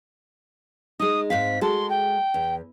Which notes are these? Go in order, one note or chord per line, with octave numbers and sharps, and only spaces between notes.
G#3 D#4 D#6
G#2 C4 F5 B6
G#3 F#4 A4 C6
G5
E2